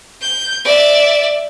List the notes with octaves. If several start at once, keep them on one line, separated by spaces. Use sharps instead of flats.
G6
D5 E5